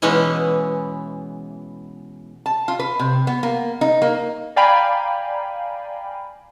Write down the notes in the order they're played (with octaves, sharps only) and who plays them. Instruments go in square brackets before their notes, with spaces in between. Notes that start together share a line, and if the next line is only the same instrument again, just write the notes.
[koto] B2 E3 G#3 B3 C#4 E4
[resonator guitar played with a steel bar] A5
F4
B4
C3
B3
A#3
D#4
A#3
[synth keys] D5 F5 G5 G#5 A#5 B5